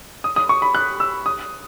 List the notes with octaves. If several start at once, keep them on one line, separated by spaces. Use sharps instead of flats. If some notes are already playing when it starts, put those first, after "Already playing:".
D#6
D#6
C#6
B5
F#6
E6
D#6